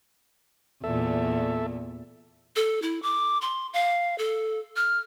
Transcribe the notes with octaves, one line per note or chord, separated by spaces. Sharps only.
E2 A#2 A4 E5
A4
E4
D6
C6
F5
A4
F6